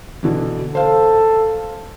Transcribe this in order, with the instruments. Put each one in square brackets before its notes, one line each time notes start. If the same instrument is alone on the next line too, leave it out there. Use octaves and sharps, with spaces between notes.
[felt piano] B2 D3 E3
[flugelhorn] A4 [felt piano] C5 F5